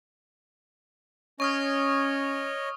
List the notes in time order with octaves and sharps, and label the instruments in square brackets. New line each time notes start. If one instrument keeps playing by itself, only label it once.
[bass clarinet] C#4 [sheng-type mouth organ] C#5 D#5 [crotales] C#6 D#6 F6